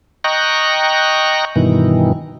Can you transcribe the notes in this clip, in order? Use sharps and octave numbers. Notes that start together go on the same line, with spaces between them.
D#5 G5 A#5 C#6 F#6
G2 B2 D#3 E3